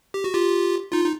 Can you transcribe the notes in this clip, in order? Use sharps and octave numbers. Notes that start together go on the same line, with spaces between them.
G4
F#4
F4 G4
D#4 F4
D#4